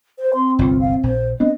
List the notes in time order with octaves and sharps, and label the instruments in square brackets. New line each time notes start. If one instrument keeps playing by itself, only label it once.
[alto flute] C5
[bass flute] C4 [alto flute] C6
[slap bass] G1 C2 [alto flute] F4
[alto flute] F5
[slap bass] A#1 [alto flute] C5
[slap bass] B3 C4 D4 [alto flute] D#5